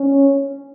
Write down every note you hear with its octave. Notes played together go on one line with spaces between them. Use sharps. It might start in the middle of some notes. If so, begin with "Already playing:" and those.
Already playing: C#4